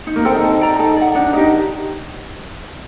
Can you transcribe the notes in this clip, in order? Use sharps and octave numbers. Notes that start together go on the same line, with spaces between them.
D#4
A#3
C4 A4 C5 G5
D#4
A4
D5 G5 A#5
D#4 A4
D5 F#5
D4 D#4
D#4 G4 A#4